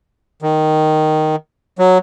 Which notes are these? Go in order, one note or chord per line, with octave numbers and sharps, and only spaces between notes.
D#3
F#3